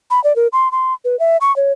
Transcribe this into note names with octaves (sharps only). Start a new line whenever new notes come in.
B5
D5
A#4
C6
C6
B4
E5
C#6
C#5